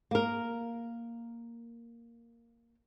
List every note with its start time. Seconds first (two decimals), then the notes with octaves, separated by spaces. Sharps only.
0.11 A#3 A#4